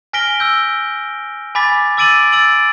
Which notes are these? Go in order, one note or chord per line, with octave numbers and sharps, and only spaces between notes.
G#5 F6 A#6 B6 D7 G7
E6 G6
G#5 B5 D6 A6 B6
D6 E6 A6 D7 D#7 F#7
E6 A6 D7 F#7